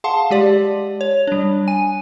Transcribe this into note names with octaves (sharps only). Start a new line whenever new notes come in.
G#4 F5 F#5 A5 C6
G#3 G4 D5
C#5
G3 D4
G#5 D#7